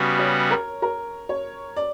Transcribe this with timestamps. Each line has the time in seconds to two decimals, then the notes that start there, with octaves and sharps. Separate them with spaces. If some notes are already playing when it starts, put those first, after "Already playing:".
Already playing: C#3 G3 B3 F#4
0.19 C#5
0.51 A#4
0.82 A#4
1.29 C#5
1.76 D5